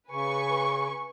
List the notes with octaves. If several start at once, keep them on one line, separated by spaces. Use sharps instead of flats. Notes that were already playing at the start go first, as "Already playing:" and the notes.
C#3 B4 G#5 C#6